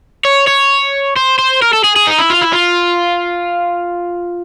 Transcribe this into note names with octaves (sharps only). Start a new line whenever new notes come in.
C#5
C#5
C5
C5
A#4
A4
G#4
G#4
D#4
E4
F4
E4
F4